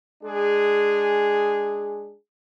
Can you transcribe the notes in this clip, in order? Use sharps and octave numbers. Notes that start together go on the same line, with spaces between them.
G#3 D4 G#4